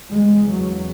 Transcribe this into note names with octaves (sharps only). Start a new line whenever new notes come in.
E2 C#3 G#3
F#3